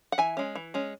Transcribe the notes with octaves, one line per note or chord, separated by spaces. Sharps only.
F#5
E3 E5 G#5
G#3 C#4
E3
G#3 C#4